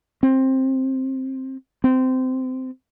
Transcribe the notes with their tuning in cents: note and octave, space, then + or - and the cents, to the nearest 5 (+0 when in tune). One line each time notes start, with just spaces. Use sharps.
C4 +15
C4 -20